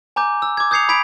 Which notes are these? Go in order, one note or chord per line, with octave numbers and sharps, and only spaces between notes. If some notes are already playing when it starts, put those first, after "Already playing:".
G#5 A#5 D6 G6
E6
D6 G#6
D#6 G6 G#6 C7 C#7 F7
B5 G#6 B6 D7 F7